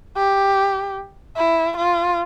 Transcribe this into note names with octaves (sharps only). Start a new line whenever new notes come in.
G4
E4
F4